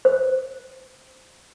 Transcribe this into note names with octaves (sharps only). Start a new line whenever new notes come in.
C5